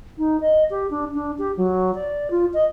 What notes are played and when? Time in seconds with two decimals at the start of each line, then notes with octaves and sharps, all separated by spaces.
0.18 D#4
0.41 D#5
0.70 G4
0.91 D4
1.14 D4
1.39 G4
1.57 F#3
1.95 D5
2.31 F4
2.54 D#5